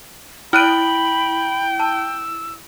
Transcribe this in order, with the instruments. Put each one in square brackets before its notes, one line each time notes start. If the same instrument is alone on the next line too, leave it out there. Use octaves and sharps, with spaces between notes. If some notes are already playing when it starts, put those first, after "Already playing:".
[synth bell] E4 D7 [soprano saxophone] G5 [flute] B5 [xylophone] F6 F#6 D#7
[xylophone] A5 [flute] E6